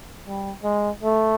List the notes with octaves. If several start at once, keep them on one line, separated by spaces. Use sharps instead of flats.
G3
G#3
A3